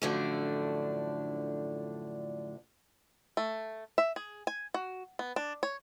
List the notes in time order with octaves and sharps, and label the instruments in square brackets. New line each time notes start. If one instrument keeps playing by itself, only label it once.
[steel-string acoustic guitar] F#2 A2 D3 F3 A3 D4
[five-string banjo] A3
E5
G#4
G#5
F#4
B3
D4
C#5